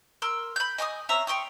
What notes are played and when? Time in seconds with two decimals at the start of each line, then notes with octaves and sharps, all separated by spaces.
0.22 A#4 C6 E6
0.56 B5 G6
0.78 D#5 G#5 D6 D#6
1.09 C4 C#4 E5 A#5
1.27 G5 C6 C#6 D#6